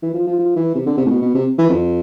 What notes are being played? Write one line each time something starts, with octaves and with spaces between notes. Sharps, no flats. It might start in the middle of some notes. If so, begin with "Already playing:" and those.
E3
F3
F3
F3
E3
C3
D3
C3
A2
B2
B2
C3
E3
F2